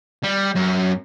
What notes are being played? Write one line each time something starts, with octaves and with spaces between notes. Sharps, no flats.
G3
F#2